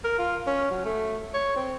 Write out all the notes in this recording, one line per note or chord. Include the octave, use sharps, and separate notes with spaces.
A#4
F4
C#4
F#3
A3
C#5
C4